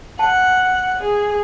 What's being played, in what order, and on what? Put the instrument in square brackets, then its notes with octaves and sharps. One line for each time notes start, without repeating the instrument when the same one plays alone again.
[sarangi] F#5 [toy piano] A5
[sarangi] G#4